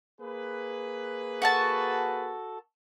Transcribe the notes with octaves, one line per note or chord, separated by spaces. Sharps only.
A#3 G#4 B4
F#4 A4 A5